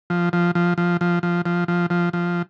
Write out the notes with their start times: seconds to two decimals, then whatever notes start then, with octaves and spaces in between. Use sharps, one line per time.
0.10 F3
0.33 F3
0.55 F3
0.78 F3
1.01 F3
1.23 F3
1.45 F3
1.68 F3
1.90 F3
2.13 F3